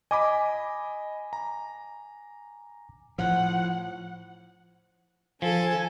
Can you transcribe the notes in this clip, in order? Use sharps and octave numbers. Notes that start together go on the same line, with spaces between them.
D#5 G#5 B5 D6
A#5
A2 F3 F#5
F3 A4 G#5